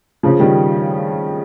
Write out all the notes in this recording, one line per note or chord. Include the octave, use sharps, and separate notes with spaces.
C#3 F3
D#3 G3